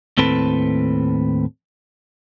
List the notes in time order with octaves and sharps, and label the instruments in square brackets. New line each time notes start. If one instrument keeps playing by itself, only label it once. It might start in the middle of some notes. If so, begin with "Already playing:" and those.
[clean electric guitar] D#2 A2 C4 A4 B4